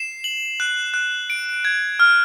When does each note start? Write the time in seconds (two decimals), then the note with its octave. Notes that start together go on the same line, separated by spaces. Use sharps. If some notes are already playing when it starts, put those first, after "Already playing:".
Already playing: C7 E7
0.24 F#7
0.60 F#6
0.94 F#6
1.30 D7
1.65 G#6
2.00 F6